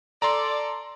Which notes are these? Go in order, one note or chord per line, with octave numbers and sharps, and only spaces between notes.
A4 D5 A#5 C6